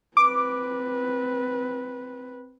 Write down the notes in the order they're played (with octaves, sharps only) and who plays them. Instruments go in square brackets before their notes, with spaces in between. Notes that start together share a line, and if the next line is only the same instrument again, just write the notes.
[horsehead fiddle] C4 B4 [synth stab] D6